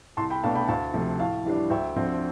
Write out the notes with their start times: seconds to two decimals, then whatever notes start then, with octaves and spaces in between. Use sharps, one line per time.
0.17 C2 A5 C6
0.30 G5 B5
0.43 B2 A3 D4 F5 A5
0.55 G5 B5
0.68 D2 F5 A5
0.93 C3 F3 A3
1.19 A2 F5 A5
1.45 E3 G3 D4
1.70 D2 E5 G5
1.96 D3 F3 C4